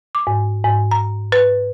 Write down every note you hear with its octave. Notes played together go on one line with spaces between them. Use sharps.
D6
G#2
G#2
A#5
B4